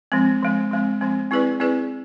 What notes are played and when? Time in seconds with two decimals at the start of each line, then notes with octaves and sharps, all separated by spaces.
0.12 F3 G#3 C4
0.42 F3 G#3 C4
0.71 F3 G#3 C4
1.01 F3 G#3 C4
1.31 C4 E4 G#4 B4 D5
1.60 C4 E4 G#4 B4 D5